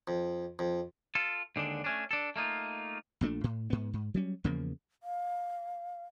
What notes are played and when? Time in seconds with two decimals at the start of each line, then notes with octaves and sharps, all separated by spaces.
0.08 F2
0.59 F2
1.15 F4 A4
1.56 D#2 D3 G#3 D4
1.84 A3 C#4 D4
2.11 D4 A4
2.36 A3 A#3 D#4 F4
3.21 A#1 A#2 A3 D4
3.44 A2
3.70 G#2 B3
3.94 G#2
4.14 F#3 G3 C#4
4.44 E2 C#3 F3 A#3
5.03 F5